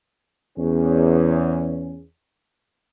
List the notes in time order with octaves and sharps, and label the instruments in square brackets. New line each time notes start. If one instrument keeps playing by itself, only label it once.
[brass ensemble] E2 C#4